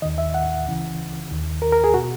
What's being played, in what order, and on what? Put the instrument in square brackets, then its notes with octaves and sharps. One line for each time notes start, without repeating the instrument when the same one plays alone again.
[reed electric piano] D#2 D#3 D#5
E5
F#5
C#2 C#3 E3
D#2 D#3
A#4
A#4
G#4
B2 F#4